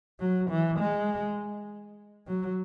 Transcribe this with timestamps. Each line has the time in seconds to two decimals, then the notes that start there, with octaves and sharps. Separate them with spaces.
0.20 F#3
0.50 E3
0.80 G#3
2.28 F#3